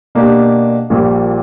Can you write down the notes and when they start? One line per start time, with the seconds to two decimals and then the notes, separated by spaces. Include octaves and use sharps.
0.15 B2 A#3 D4 G4
0.90 A#1 A#2 G3